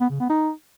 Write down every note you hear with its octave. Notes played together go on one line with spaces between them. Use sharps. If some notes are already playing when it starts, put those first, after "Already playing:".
B3
C#3
B3
D#4